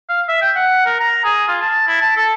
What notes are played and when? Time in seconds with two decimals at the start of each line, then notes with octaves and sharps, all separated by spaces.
0.09 F5
0.28 E5
0.42 G5
0.56 F#5
0.86 A#4
1.00 A#5
1.24 G#4
1.48 F4
1.61 A5
1.87 E4
2.01 A5
2.16 A4